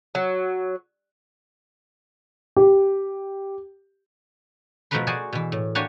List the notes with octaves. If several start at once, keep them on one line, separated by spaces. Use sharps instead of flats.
F#3
G4
B2 F3 A3 A#4 B4 C6
F#4 G#4 C5 D5 G#5
B2 E3
A2
A#3 D4 F#4 G4 C#5 G#5